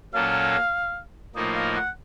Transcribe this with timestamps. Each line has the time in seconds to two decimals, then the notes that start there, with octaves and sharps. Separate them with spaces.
0.14 A#2 F#3 A#3 C#4 A4 F5
1.36 A2 F3 A#3 D#4 A#4 D#5
1.55 F5
1.76 F#5